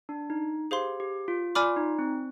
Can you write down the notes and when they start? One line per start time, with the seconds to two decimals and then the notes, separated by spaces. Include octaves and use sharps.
0.09 D4
0.30 D#4
0.71 G4 G#4 C5 F5 C6
1.00 G4
1.28 F4
1.55 F4 D5 G#5 B5 D6 F6
1.77 D#4
1.99 C4